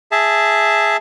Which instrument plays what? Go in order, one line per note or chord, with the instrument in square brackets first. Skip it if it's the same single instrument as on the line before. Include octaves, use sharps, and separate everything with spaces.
[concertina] G#4 E5 A5